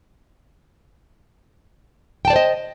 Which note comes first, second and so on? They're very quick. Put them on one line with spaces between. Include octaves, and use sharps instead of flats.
G5 A5 D5 C5 D#5